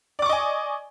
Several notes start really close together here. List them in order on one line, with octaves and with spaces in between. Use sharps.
D5 D6 C#6 D#5 G#5